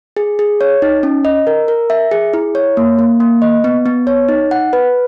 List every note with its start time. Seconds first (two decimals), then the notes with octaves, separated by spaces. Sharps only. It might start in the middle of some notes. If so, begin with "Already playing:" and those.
0.17 G#4
0.39 G#4
0.61 C#5
0.82 D#4
1.03 C#4
1.25 D#5
1.47 A#4
1.68 A#4
1.90 E5
2.11 G#4
2.34 E4
2.55 C#5
2.77 A#3
2.99 A#3
3.20 A#3
3.42 D#5
3.64 B3
3.86 B3
4.07 C#5
4.29 D#4
4.51 F#5
4.73 B4